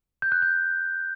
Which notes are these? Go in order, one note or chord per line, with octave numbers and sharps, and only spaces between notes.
G6
F#6
G6